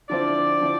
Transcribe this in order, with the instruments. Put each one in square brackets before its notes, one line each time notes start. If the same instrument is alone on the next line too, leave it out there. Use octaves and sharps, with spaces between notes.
[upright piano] D3 F3 C4 E4 [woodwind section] D5
[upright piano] D3 F3 C4 E4